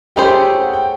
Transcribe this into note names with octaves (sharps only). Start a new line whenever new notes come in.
A3 C#4 E4 G4 G#4 C5 G5
F#5
G5